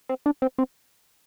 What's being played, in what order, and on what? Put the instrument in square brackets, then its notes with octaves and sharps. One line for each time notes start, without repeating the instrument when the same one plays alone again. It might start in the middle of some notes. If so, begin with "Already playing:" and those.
[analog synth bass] C4
D4
C4
C4